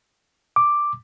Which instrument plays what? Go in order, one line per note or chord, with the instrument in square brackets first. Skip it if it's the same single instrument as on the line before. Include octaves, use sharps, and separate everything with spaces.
[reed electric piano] D6